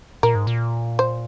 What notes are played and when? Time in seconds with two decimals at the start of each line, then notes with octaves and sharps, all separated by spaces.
0.23 A#2 A#4
0.35 G#2
0.47 A#2
0.99 C5